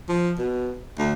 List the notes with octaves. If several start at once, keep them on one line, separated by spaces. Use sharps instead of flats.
F3
B2
D2